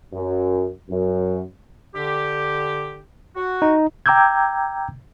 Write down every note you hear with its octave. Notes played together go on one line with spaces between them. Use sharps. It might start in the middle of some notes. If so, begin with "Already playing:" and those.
F#2
F#2
D3 G4
F#4
D#4
G5 A#5 D6 E6 G6 G#6